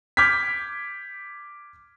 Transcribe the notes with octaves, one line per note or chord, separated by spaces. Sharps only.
D6 F6 G6 G#6 B6